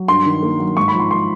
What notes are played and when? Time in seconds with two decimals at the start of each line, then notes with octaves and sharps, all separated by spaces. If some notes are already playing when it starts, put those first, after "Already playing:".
Already playing: F#3
0.08 G2 C6
0.26 D#3
0.42 A#3
0.60 F#3
0.77 G#2 C#6
0.88 B5
0.94 F3
1.00 C6
1.11 C6